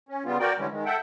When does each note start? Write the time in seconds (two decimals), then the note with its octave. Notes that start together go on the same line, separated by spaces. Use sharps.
0.09 C#4
0.25 C#3 G3 B3 F4
0.40 F#4 A#4 D5 G5
0.58 D3 E3 G3 G#3 C#4
0.72 D#3 G#3
0.85 A4 E5 F#5 G5